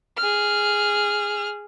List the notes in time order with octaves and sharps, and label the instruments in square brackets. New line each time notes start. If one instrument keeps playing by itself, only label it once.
[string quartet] G#4 F6